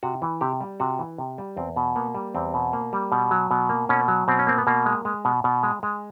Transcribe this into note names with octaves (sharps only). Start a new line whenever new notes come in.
C3 F#4
E3
C3 G4
G3
C3 F#4
E3
C3
G3
E2 C4
B2
A#3 B3
G3
E2 C4
B2
A#3
G3
B2
F#3
B2
A#3
B2 C#4
F#3
B2 C4
C#4
A#3 C4
B3
B2 A#3
G#3
G#3
B2
B2
G#3
G#3